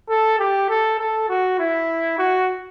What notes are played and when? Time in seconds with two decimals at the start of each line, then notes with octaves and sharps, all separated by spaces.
0.10 A4
0.39 G4
0.69 A4
0.99 A4
1.29 F#4
1.59 E4
2.19 F#4